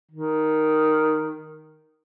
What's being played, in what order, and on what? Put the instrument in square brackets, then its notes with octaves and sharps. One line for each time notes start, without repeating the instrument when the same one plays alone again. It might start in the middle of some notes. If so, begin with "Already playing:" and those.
[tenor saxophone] D#3